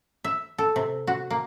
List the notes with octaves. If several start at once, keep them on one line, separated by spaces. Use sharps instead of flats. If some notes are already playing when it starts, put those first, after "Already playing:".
E5
A4
C3
F#4
A#3